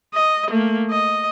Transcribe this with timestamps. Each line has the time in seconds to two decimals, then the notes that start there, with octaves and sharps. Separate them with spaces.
0.14 D#5
0.49 A3 A#3
0.90 D#5